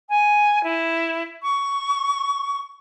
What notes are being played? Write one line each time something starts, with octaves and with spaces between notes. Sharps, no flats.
G#5
E4
C#6